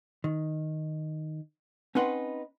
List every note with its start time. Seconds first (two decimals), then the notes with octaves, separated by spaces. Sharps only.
0.24 D#3
1.95 C4 C#4 D#4 B4 F#5 C6